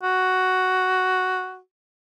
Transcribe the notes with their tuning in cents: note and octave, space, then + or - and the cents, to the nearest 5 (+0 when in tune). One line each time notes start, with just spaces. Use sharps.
F#4 +5